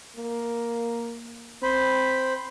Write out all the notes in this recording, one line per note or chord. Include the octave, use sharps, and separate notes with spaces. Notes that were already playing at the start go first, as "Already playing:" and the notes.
A#3
C4 C5 B5